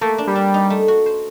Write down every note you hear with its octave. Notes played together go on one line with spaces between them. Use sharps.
A3 A#3
D4
G3
D4
D#4
A3
F#4
C5